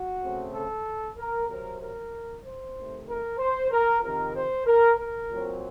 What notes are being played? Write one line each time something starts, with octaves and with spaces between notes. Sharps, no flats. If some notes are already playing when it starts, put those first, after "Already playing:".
Already playing: F#4
C#3 A3 C4
A4
A#4
C3 F#3 C4 A#4
A#4
C5
C3 D#3 A3
A#4
C5
A#4
F2 C3 D#3 A#4
C5
A#4
A#4
A#2 F#3 C4